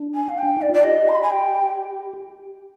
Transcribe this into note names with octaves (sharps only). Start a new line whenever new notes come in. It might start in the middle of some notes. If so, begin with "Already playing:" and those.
Already playing: D4
G#5
F5
G5
D4
D#4 D5
F4 D5
G4 D#5
C6
B5
G#5
G5